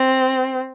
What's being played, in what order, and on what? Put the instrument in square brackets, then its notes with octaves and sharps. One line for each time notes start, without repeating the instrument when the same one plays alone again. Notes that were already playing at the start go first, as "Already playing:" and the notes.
Already playing: [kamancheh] C4